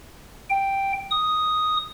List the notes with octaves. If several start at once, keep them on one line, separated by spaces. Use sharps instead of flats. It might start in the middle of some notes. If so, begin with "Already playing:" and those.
G5
D#6